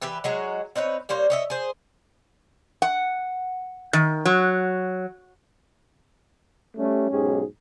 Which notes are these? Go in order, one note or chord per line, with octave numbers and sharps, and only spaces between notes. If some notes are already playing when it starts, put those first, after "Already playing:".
E3 G4 B4 E5
F#3 G#3 F#4 A#5
C4 D#4 B4 C#5
G3 A#3 C5 C#5
C#5 D#5 E5
G#4 C5
F#5
D#3
F#3
G3 A3 C#4
B1 G#2 G#3 C#4 G4 G#4